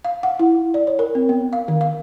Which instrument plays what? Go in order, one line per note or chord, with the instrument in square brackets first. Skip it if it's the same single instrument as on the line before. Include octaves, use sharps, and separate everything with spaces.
[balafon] F5
F#5
E4
D5
C#5
A#4
C4
B3
F5
D#3
F5